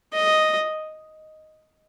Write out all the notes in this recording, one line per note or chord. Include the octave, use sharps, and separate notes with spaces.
D#5